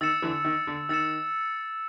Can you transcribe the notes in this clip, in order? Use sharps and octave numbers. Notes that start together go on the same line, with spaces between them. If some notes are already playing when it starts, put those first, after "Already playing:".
D#3 E6 A6 C#7 E7
D3 E3
D#3
D3
D#3 E6 A6 C#7 E7